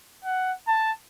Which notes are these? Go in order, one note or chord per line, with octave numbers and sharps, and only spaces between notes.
F#5
A5